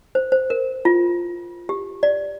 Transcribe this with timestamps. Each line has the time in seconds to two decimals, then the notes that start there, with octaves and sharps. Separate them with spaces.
0.15 C5
0.32 C5
0.50 A#4
0.85 F4
1.69 G4
2.03 D5